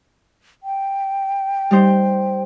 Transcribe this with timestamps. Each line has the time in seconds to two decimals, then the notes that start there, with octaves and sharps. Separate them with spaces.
0.63 G5
1.71 G3 D#4 C5